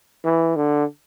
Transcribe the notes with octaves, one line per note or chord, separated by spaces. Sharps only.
E3
D3